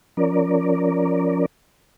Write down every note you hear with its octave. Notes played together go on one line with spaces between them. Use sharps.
F3 C#4 A#4 D5